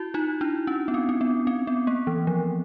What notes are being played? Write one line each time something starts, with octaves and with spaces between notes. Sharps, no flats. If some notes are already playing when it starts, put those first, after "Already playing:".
Already playing: E4 F#4
D#4 F4
D4 E4
C#4
B3
C4
C4
B3
C4
B3
A#3
E3
F3